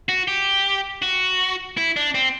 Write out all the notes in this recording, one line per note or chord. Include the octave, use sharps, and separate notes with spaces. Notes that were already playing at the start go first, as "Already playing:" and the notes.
F#4
G4
F#4
E4
D4
C4